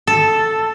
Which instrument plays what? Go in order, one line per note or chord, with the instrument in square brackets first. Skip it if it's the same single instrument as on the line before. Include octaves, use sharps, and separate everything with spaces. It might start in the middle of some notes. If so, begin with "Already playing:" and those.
[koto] A4